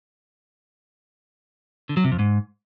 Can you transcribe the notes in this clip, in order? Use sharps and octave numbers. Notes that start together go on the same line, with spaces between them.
D3
F#3
C3
F2
G#2